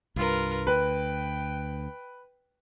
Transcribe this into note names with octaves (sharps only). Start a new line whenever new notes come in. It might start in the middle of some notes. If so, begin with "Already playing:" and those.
C2 G2 F4 A#4 B4
D2 B4 G5